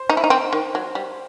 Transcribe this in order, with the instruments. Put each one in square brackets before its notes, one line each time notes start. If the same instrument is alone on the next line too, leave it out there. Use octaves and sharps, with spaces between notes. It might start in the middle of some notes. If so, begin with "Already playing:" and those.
Already playing: [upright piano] C5
[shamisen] D#4
E4
D#4
C4
D#3
F#3
G3